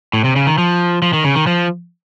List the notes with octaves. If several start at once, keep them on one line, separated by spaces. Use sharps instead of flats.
A2
C3
C#3
D#3
F3
F3
D#3
C#3
D#3
F3